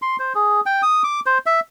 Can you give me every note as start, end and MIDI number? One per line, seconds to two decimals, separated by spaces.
0.02 0.16 84
0.20 0.33 72
0.35 0.61 68
0.66 0.82 79
0.83 1.03 87
1.04 1.20 86
1.26 1.38 72
1.46 1.60 76